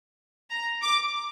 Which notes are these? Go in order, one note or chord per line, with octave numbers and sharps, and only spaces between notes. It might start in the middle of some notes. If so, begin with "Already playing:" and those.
A#5
D6